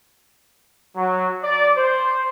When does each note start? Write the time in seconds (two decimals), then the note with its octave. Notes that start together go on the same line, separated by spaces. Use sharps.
0.96 F#3
1.44 D5
1.77 C5